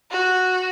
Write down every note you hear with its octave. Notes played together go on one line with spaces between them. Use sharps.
F#4